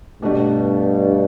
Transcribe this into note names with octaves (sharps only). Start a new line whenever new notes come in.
G2 B2 A3 D4 G4